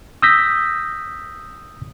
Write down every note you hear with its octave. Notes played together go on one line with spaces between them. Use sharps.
D#6 E6 G6 A#6 B6